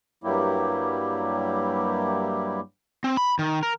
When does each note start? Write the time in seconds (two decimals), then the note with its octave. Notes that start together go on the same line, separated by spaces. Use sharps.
0.24 G2 F#3 G3 A#3 E4 G4
3.04 C4
3.17 B5
3.39 D#3
3.63 A#4